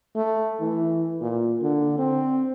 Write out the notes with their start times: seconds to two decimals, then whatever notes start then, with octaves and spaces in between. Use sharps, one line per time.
0.15 A3
0.61 E3
1.21 A#2
1.61 D3
1.98 C4